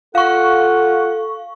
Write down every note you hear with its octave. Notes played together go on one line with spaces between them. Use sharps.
F4 A4 F5 F#5 C#6